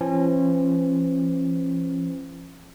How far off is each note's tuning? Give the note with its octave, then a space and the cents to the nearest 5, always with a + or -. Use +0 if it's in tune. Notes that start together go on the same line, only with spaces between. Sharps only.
F3 -45 C#4 -40